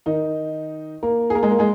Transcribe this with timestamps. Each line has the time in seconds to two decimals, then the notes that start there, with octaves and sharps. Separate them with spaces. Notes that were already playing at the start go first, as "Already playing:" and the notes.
0.06 D#3 D#4
1.03 A#3 A#4
1.30 G#4
1.35 A#3 A#4
1.43 G#3 G#4
1.51 A#3 A#4
1.59 G#3 G#4